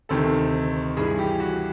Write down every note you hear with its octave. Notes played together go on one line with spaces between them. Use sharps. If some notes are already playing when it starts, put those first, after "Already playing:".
D2 C3 D#3 A4
G2 E3 G#4
G4
F#4